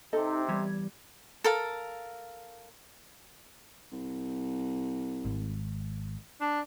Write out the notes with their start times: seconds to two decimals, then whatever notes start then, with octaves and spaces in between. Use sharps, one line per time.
0.13 C3 D#4 A4 D#5
0.48 E2 G3 G#6
1.44 A4 A#4 F5
3.92 C2
5.25 G#1
6.41 D4